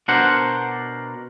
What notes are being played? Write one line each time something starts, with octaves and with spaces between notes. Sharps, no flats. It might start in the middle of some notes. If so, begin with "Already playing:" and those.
B2 D4 A#4 C5 F#5